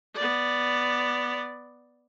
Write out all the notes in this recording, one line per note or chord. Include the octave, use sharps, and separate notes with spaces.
B3 D5